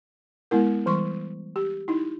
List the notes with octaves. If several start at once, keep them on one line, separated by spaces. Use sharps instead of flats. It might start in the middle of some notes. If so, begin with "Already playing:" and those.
G#3 B3 E4 A#4
E3 G3 C6 C#6
G4
D#4 E4